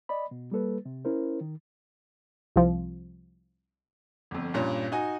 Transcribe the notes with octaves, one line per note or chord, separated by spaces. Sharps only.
D5 D#5 B5
B2
G3 A#3 A4 B4
C3
C#4 E4 A#4 C5
D#3
C2 F3
G1 F2
G2 A#2 C#4
D#4 F#4 G#5